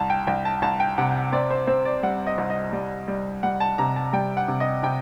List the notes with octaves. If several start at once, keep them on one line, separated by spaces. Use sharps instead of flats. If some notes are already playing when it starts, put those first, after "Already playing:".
Already playing: C2 A5
G5
C2 G5
A5
C2 A5
G5
C3 F#5
C4 D5
C5
C4 C5
D5
G3 F#5
D#5
C2
D#5
G3
G3
G3 F#5
A5
C3 A#5
A5
G3 G5
F#5
C3
D#5
C3 G5